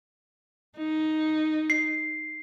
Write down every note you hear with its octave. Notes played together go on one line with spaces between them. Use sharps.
D#4
C7